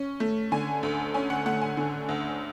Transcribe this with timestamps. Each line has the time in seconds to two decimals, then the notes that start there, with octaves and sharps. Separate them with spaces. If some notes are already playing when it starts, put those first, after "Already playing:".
Already playing: C#4
0.20 A3
0.52 D3 G#5
0.83 D2
1.14 C#4 G#5
1.30 F#5
1.46 A3 F#5
1.62 G#5
1.77 D3
2.09 D2